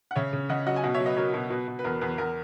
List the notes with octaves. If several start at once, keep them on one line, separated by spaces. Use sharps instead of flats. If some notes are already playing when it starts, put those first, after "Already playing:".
F#5
C#3 C#5 E5
C#3
C#3 D#5 F#5
F#3 D#5 F#5
G#5
B2 D#5 F#5
C#5 E5
F#3
B4 D#5
F#3 A#4 C#5
B2
B2 B4
B2
B4
E2 A#4
E2 B4
E2 A#4